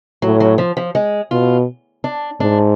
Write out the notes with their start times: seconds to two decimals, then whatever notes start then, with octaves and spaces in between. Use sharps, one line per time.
0.22 A2 F#3
0.40 F#3
0.58 F3
0.77 F3
0.95 G#3
1.31 B2 F4
2.04 D4
2.40 G#2 D4